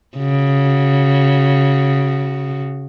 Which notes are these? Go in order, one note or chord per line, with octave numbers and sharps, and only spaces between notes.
C#3 F#4